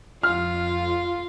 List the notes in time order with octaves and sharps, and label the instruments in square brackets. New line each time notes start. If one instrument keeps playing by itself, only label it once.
[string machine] F2 [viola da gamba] F4 [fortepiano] F6